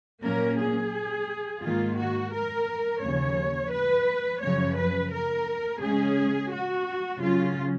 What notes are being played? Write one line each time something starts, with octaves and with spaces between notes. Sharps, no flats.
A#2 F#3 A#3 C#4 A#4
G#4
G#2 D#3 A#3 F4
F#4
A#4
D#2 C#3 F3 C#5
B4
F#2 C#3 F3 C#5
B4
A#4
C#3 G#3 C#4 G#4
F#4
C#3 F#3 C#4 F4